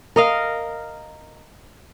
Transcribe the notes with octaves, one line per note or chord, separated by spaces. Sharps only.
A#4 D#5 F5